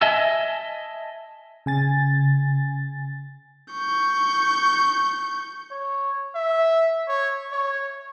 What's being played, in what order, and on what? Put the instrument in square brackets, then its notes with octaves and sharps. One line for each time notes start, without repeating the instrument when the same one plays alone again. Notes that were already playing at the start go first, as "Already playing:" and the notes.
[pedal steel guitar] D#5 E5 G#5 A5 E6
[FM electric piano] C#3 G#5 A6
[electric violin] C#6 G6
[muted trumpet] C#5
E5
C#5
C#5